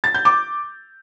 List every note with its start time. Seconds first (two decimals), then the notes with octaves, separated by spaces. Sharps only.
0.04 A6
0.14 G6
0.25 D6